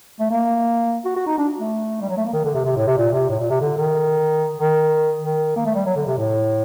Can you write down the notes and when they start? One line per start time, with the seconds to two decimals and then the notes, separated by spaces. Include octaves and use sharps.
0.20 A3
0.31 A#3
1.05 F#4
1.16 F#4
1.27 D#4
1.38 D4
1.59 A3
2.01 G3
2.09 F#3
2.17 A3
2.25 A#3
2.33 D#3
2.45 D3
2.55 C3
2.65 C3
2.76 A2
2.87 C3
2.97 A#2
3.13 C3
3.29 A2
3.40 A#2
3.50 C3
3.61 D3
3.77 D#3
4.58 D#3
5.21 D#3
5.56 A#3
5.65 A3
5.75 G3
5.86 F#3
5.96 D3
6.07 C3
6.18 A2